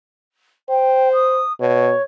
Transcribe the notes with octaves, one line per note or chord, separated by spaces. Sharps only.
C5 G5
D#6
B2 C#5